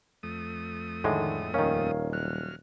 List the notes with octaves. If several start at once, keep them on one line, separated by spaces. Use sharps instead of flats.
F2 A3 D#6
A2 D3 D#3 G#3
D#1 D#3 C#4 A#4 C#5 F5
F#3 F6 F#6